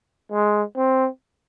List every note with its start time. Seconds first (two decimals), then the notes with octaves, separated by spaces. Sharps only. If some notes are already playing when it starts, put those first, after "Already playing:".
0.32 G#3
0.77 C4